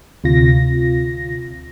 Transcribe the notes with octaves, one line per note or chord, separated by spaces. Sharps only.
D2 C3 F4 A#6